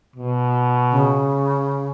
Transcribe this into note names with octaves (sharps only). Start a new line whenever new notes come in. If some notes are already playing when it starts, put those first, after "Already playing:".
B2
C#3